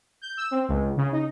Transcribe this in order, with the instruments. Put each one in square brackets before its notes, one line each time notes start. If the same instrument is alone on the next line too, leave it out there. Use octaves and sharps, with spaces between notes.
[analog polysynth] G6
E6
C4
C#2
C#3
D#4